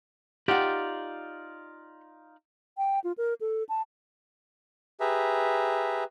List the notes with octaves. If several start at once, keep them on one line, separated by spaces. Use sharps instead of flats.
D#4 F4 G4 D5 F#5
G5
F4
A#4
A4
A5
G4 G#4 B4 E5 A#5